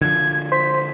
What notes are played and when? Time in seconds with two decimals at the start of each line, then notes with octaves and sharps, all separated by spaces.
0.01 D3 F3 G#6
0.52 C5 B6